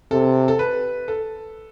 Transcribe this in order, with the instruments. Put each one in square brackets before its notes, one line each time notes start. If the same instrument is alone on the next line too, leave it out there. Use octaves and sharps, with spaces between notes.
[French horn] C3 [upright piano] A4
[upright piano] A4
B4
A4